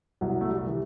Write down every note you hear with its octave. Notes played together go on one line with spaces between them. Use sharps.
C2 F#3
A3
G3
C3 E3